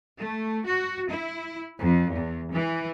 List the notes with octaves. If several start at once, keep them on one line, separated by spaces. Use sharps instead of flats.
A3
F#4
E4
F2
E2
E3